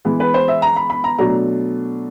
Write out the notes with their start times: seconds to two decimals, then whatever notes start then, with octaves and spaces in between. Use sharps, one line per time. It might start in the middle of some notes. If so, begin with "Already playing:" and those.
0.05 E3 G#3 B3
0.20 B4
0.34 C5
0.48 E5
0.62 A#5
0.76 B5
0.90 B5
1.04 A#5
1.18 B2 F#3 A3 D4 A#5